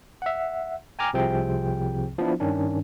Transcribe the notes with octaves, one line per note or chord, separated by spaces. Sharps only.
E5 F#5
G5 G#5 A#5 D6 F6
C2 C3 F3 C4 G#4 G5
F3 B3 D4 E4
G2 D#3 C#4 D4